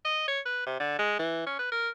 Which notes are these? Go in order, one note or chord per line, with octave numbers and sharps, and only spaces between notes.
D#5
C#5
B4
C3
D3
G#3
E3
C#4
B4
A#4